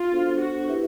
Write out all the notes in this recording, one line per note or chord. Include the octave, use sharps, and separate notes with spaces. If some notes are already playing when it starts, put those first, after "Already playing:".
Already playing: F4
B3 D4 F#4 A4 C5
F#4
E4 G4 B4 E5